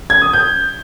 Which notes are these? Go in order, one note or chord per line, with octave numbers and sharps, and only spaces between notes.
G#6
D#6
G6